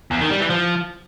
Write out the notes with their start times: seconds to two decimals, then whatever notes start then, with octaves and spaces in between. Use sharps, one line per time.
0.11 E2
0.21 D#3
0.30 G3
0.40 E3
0.50 F3